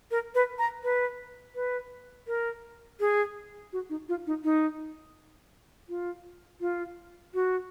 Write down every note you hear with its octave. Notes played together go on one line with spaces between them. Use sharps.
A#4
B4
A#5
B4
B4
A#4
G#4
F#4
D#4
F4
D#4
D#4
F4
F4
F#4